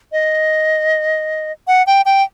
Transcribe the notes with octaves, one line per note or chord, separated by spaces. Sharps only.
D#5
F#5
G5
G5